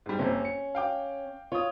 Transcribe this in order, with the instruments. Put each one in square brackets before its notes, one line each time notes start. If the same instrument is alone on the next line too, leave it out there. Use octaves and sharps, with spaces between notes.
[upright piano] G#2 G3
[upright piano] F#1 C3 [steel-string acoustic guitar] C#4
[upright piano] C#7
F5 G5 D6
[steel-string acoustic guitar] F4 [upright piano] C#5 D#6